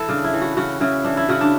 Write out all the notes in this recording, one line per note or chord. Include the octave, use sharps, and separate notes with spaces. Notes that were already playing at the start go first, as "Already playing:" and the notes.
Already playing: E3 A4 B4
C#3 D4
E4
E3
F#4
C#3 F#4
C#3 E4
E3 D4
E4
C#3 F#4
D4